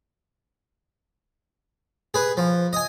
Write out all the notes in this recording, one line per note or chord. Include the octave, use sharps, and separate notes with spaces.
G#4 B4
F3
D#5 G#5